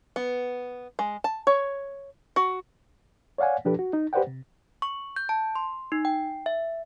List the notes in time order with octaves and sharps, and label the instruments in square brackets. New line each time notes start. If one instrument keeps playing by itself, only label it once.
[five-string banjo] B3
G#3
A5
C#5
F#4
[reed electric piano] C#5 D5 F5 F#5 G#5
B2 F3 D4 G4 A4 B4
F#4
D#4
G4 B4 C5 D5 F#5 G5
C3
[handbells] C#6
G6
A5
C6
D#4
G5
E5